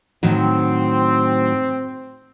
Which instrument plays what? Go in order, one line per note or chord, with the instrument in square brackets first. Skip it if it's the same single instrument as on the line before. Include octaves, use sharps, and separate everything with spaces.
[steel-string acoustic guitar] A2 D#3 F#3 [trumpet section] C4